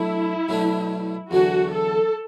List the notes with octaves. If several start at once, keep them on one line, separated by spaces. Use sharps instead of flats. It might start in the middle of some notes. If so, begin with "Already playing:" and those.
Already playing: B2 F#3 A3 D4 E4
B2 F#3 A3 D4
E2 D3 F#3 F#4
A4